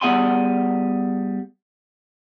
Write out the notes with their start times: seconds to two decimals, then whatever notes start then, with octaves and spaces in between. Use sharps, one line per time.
0.01 G3 B3 G#4 F#5 G#5 C6